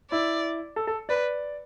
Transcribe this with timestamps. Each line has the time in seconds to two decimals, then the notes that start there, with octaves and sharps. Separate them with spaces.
0.11 E4 D5
0.76 A4
0.87 A4
1.09 B4 D5